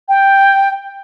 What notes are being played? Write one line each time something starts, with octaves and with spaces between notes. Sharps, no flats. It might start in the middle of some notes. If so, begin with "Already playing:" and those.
G5